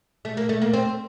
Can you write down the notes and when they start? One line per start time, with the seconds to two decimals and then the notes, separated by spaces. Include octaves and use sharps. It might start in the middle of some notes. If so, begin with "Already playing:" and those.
0.25 A3
0.37 A#3
0.49 A3
0.62 A#3
0.73 C4